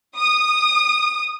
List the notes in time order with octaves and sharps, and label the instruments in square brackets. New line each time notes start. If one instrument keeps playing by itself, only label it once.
[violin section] D#6